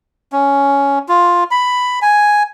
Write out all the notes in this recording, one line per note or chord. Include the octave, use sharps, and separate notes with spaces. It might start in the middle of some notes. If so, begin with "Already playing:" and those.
C#4
F4
B5
G#5